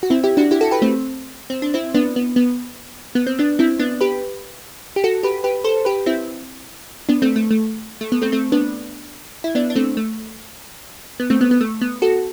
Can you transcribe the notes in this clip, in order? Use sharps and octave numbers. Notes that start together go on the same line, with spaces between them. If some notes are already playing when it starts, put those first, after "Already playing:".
F#4
C4 E4
E4 G4
D4 F#4
E4 G4
F#4 A4
G4 B4
A3 C4
C4
D4
C4 E4
B3 D4
B3
B3
B3
C4
B3 D4
C4 E4
B3 D4
G4 B4
G4
F#4 A4
G4 B4
G4 B4
A4 C5
G4 B4
C4 E4
B3 D4
A3 C4
A3
A3
A3
B3
A3 C4
A3 C4
B3 D4
E4
B3 D4
D4
A3 C4
A3
B3
A3 C4
B3
B3
A3
B3
F#4 A4